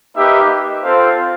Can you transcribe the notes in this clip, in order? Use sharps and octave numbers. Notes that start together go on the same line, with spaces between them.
A#3 D#4 G4 B4 E5
C4 F4 A4 C5 F5